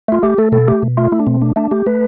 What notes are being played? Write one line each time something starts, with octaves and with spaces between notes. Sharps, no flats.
A3 F4
A3 G4
A3 A4
B2 A4
A3 G4
B2
A3 F4
A3 E4
D4
B2 C4
A3 D4
A3 D4
A3 G4
A3 B4